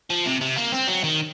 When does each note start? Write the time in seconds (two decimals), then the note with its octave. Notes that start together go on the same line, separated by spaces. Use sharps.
0.10 F3
0.26 C3
0.41 C3
0.57 A#3
0.72 C4
0.88 F#3
1.04 D#3